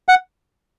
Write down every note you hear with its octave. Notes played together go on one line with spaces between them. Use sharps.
F#5